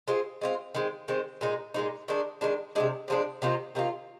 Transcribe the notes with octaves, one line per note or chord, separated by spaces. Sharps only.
G#3 C4 F4
G#3 C4 F4
D#3 G#3 C4
D#3 G#3 C4
A#2 G#3 D#4
A#2 G#3 D#4
D#3 G#3 D4
D#3 G#3 D4
C3 F3 G#3 D4
C3 F3 G#3 D4
C3 D#3 A#3 F4
C3 D#3 A#3 F4